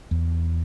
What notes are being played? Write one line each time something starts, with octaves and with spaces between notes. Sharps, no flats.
E2